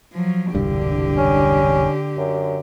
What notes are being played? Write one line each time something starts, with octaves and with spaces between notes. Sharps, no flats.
F3 F#3
E1 C2 G2 D3 G4
C#4
F#2